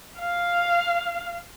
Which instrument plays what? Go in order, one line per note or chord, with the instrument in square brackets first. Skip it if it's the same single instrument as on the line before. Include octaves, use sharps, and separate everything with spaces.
[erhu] F5